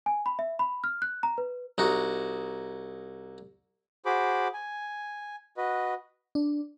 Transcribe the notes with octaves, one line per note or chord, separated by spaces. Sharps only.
G#5
B5
E5
B5
F6
F#6
A#5
B4
C2 D#4 F#4
F#4 G#4 C5 B5 D6
G#5
F#4 B4 D#5
D4